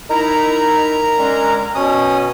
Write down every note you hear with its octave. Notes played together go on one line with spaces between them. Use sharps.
D#4 E4 A#4 A#5
D3 G#3 C#4
B2 C#4 D#6